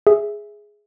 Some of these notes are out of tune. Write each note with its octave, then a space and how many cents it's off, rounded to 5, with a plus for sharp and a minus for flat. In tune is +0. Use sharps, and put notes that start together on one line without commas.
G#4 +0 E5 +0